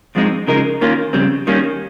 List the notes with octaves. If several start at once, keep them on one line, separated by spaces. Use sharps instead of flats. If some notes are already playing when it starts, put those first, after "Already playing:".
G#2 F3 G#3 C4 D#4
C#3 F3 G#3 D#4 A#4
D#2 D#3 A#3 C#4 F4
F2 C#3 G3 C4
D#2 D#3 G3 A#3 C#4